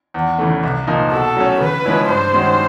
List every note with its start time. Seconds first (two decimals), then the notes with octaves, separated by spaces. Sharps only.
0.14 E2
0.39 C#3 E3 A3
0.64 C2
0.87 A#2 F3 A#3 D#4
1.12 B2 A4
1.36 F#3 A3 C#4
1.60 C#3 B4
1.85 F3 G#3 C#4 E4
2.09 G2 C5
2.33 D#3 G#3 C#4 F#4